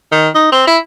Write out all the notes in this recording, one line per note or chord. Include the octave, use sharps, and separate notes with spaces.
D#3
D#4
C4
E4